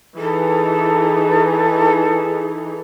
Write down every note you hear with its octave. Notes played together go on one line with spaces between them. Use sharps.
E3 D#4 G#4 A4